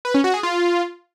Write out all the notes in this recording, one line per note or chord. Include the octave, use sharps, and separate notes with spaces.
B4
C#4
F#4
G#4
F4